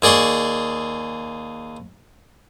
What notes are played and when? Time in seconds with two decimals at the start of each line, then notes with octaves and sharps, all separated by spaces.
0.02 D#2 G#4 D5 C6 C#6